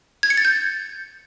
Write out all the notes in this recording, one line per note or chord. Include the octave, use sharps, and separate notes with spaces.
G#6
C#7
A6
G6